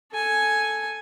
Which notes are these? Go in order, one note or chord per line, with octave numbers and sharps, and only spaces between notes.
A4 G#5